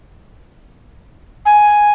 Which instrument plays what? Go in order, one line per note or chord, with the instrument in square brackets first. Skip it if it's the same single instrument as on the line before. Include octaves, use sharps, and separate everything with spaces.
[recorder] G#5